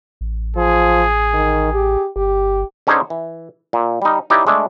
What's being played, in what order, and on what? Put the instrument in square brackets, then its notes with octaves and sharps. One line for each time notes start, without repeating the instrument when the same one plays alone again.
[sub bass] A1
[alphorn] F3 [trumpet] G#4
[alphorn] D#3
G4
[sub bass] G1 [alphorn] G4
[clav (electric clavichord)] D3 C#4 D#4 G#4 C5 C#5
E3
A#2
G3 D#4
D#4 E4 G4 B4 C#5 D5
G#3 A3 D4